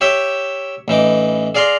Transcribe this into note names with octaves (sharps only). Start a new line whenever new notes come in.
G4 C#5 E5 G5
A1 E3 D#4 D6
G#4 D5 F5 A#5 C6